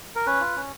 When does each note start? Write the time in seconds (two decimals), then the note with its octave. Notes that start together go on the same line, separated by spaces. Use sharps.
0.16 A#4
0.26 C#4 B4
0.41 F4
0.56 C#4